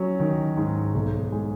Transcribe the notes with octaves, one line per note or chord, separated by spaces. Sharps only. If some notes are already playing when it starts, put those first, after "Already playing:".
Already playing: F#3 C#4
D#3
G#2
B1
G#3